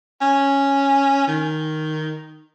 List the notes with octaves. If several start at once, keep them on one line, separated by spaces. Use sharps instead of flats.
C#4
D#3